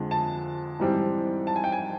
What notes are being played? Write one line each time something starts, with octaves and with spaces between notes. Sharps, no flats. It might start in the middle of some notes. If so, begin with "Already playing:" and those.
Already playing: F2 D3 F3 G#3
A5
G#2 E3 G3 C4
A5
G#5
G5
G#5